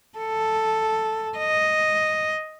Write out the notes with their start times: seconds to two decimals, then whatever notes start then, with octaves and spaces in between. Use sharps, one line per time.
0.18 A4
1.37 D#5